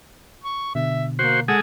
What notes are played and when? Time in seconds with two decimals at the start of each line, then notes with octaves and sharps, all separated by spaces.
0.44 C#6
0.75 B2 D3 E5
1.19 A#3 F#4 C5
1.48 G#3 G#4 A4 F#5